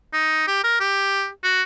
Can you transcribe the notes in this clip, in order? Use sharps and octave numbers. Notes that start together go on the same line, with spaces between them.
D#4
G4
A#4
G4
F#4